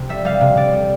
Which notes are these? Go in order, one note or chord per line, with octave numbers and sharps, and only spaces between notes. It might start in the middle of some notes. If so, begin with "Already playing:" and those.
Already playing: C3
G3 E5
G3 F5
C3
C3 D5
G3